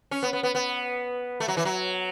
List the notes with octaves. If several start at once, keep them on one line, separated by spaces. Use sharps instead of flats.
C#4
B3
B3
B3
B3
A3
F#3
E3
F#3